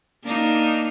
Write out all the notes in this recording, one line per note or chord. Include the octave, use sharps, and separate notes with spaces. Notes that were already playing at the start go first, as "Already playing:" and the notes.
A#3 D4 D#4